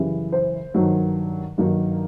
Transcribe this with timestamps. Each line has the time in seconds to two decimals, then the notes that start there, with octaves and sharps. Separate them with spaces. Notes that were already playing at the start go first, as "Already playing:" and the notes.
Already playing: F#2 C#3 E3 G3
0.32 C5
0.74 G2 D#3 F#3 A#3 D#4
1.58 G2 D#3 F#3 A#3 D#4